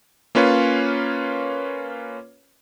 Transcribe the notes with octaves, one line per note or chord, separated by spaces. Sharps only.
A#3 C#4 F4 B4 C#5 F5